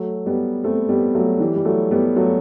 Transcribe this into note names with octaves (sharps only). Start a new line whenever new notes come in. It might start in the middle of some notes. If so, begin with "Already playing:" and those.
Already playing: F#3 A3
G3 B3
A3 C4
G3 B3
F#3 A3
E3 G3
G3
F#3 A3
G3 B3
F#3 A3